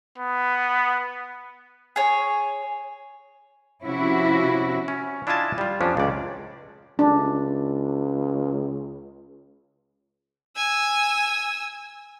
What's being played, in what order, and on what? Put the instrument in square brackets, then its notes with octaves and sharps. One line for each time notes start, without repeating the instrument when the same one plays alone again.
[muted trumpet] B3
[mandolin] G#4 C#5
[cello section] C3 F3 C#4 E4 F#4
[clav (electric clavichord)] C#4
D4 E4 F4 D#5 G#5 A5
G3 F4
F2 F3 C#4 D4
C#2 D5
[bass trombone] C#2 [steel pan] D4
[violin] G#5 E6